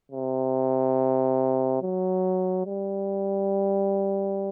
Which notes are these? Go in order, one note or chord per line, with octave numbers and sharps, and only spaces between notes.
C3
F#3
G3